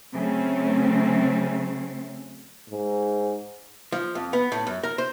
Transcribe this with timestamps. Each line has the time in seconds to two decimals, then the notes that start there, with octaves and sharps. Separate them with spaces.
0.12 C#3 F#3 A3 C4 C#4
2.70 G#2
3.92 F3
4.15 F2
4.33 B3
4.52 A2
4.67 F#2
4.83 A#4
4.98 C5